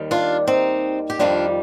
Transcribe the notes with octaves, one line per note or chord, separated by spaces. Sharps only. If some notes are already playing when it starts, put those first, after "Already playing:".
Already playing: D#2 D#3 G3
D4 F4
C4 D#4
G4
F2 D#3 G3 D4 F4